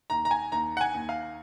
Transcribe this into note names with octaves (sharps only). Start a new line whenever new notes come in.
D#2 A#5
A#5
G#5
D#2 A#5
F#5
G#5
D#2
F5